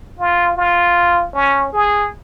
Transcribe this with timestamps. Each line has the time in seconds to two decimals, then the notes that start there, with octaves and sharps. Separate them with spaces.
0.19 F4
0.57 F4
1.33 C#4
1.73 G#4